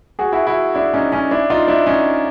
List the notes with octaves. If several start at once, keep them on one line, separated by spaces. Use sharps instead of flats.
F#4 G#4
E4 F#4
E4 F#4
D4 E4
C#4 D#4
C#4 D#4
D4 E4
D#4 F4
D4 E4
C#4 D#4